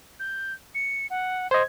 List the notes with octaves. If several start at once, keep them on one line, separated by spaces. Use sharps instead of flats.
G6
C#7
F#5
C5 D#5 G#6